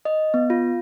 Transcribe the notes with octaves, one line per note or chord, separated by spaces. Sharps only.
D#5
B3
F4